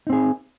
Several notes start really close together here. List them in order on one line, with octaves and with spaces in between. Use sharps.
D#4 C4 G#4